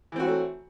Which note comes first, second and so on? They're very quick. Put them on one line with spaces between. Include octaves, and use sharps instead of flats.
E3 C4 F#4 F#3 A3